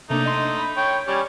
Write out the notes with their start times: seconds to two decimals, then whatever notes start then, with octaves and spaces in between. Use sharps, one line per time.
0.10 C3 A3 A#3 D4 D#4
0.25 D#5 C6
0.57 B5
0.77 C#5 G5
1.08 G3 C#4 C#6 G#6